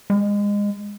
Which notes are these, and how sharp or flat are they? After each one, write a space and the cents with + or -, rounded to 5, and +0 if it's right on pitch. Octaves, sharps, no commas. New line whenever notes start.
G#3 -25